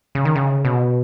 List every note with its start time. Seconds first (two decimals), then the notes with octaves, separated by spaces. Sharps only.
0.15 C#3
0.25 D#3
0.35 C#3
0.65 B2